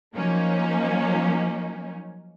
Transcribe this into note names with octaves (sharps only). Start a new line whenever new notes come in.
F3 F#3 A#3 C#4 D#4